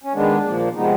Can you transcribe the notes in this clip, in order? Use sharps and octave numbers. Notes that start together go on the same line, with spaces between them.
C#4
D#3 G#3 B3 D4
A#2 F3 A#3
C3 F3 G#3 B3 D#4